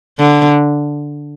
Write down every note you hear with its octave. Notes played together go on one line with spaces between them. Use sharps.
D3